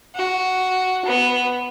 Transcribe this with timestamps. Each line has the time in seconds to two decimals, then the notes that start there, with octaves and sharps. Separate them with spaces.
0.15 F#4
1.05 B3